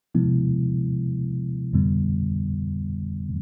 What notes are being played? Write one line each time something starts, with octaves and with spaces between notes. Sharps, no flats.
C3 F3 G#3 B3 E4
F2 D3 G3 B3